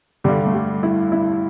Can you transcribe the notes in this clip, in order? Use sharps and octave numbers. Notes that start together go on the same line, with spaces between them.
G2 D3 G3
A3
G3
E4
E4